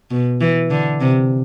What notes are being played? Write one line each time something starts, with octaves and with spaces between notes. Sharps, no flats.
B2
E3
D3
C3